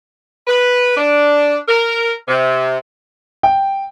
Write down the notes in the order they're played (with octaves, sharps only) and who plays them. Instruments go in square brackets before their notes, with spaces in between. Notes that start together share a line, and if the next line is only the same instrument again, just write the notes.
[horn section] B4
D4
A#4
C3
[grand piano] G5